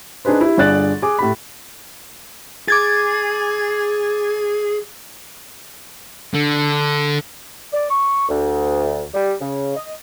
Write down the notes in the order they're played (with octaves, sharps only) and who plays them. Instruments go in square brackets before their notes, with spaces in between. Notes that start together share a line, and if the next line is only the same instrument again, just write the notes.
[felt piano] D4 D#4 G#4 B4 C5
E4 G4
G1 D3 G#4 D5 F#6 A6
G#4 D6
A2 G4 B5
[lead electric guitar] G#4 [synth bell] D6 G#6 A6
[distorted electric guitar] D3
[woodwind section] D5
C#6
D2
G3
C#3
D#5